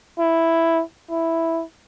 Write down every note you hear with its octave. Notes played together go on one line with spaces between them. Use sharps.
E4
E4